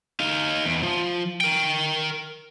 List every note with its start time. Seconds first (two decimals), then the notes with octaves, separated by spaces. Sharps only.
0.20 D#4 F5
0.65 E2
0.83 F3
1.41 A#4 G5